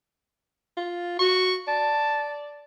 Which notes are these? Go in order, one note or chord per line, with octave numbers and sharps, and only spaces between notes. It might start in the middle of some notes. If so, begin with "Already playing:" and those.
F4
F#4 C#6
D5 A5